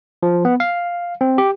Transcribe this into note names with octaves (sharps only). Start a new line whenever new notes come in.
F3
B3
F5
C4
G4